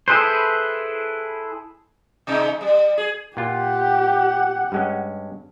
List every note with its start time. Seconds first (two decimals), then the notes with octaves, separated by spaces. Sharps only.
0.08 E4 G#4 A4 B4 C5
2.27 C3 G#3 D#4
2.61 G3
2.98 G#4
3.37 A#2 F4 G4 F#5
4.72 G2 G#3 C#4